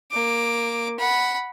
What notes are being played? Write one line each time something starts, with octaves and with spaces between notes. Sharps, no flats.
A#3 D6
F#5 B5